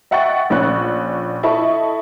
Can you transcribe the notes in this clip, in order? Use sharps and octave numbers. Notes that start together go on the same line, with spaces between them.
D#5 E5 F#5 G5 C#6 A6
A#1 C#4 C#6 F#6
E4 A4 D#5 A5 B5 C#6